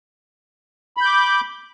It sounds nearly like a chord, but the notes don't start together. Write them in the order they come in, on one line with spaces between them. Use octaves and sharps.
B5 G6 D6